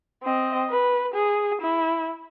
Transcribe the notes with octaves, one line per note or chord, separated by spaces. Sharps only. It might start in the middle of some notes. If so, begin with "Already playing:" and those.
C4 D#5
B4
G#4
E4